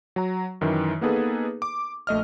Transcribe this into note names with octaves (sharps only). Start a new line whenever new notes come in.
F#3 A#5
F#2 D#3 E3
A#3 B3 D#4 G#4 A4 B4
D6
A#1 A3 D#5 F6